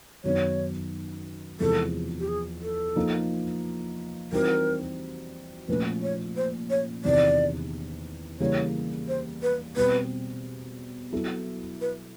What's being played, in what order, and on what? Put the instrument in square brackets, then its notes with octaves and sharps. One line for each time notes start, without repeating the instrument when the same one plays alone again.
[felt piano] F#2 D#3 F#3 B3 D#4 [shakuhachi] C#5
[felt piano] E2 C3 F3 G#3 [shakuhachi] A4
[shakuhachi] G4
G#4
A4
[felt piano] F3 A#3 D#4
[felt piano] E3 G3 C4 D#4 F#4 [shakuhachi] A#4
[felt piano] A#2 F3 A3 C#4 [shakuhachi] B4
[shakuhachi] C#5
C5
C#5
[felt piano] E2 C3 D#3 [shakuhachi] D5
[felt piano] C#3 E3 G3 A#3 [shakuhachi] C#5
[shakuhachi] C5
B4
[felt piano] B2 G3 C4 [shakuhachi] B4
[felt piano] F#3 B3 E4 A4
[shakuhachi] B4